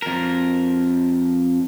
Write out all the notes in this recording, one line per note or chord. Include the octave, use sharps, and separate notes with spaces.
F2 A#4